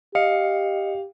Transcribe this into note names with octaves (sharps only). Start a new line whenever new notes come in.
G4 D#5 F5 C#7